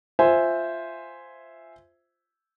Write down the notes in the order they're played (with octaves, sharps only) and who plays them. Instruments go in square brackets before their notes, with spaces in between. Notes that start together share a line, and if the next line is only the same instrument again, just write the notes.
[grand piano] F4 C5 E5 G#5